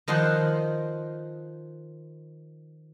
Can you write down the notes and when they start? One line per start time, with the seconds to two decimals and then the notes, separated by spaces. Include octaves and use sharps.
0.08 D#3 F3 F4 D#5 F#5 C6